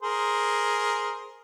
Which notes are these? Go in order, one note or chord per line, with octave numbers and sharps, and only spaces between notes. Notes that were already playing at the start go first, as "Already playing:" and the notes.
G#4 A#4 C5